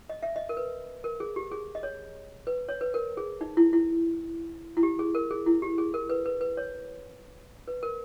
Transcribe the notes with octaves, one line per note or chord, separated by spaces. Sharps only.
D#5
E5
D#5
A#4
B4
A#4
G#4
G4
G#4
D#5
C#5
B4
C#5
B4
A#4
G#4
D#4
E4
E4
E4
G4
G#4
A#4
G#4
E4
G4
G#4
A#4
B4
B4
B4
C#5
B4
A#4